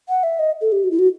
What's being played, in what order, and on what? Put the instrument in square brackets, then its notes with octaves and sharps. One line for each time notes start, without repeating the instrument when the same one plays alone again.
[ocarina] F#5
E5
D#5
A4
G4
F#4
E4
F#4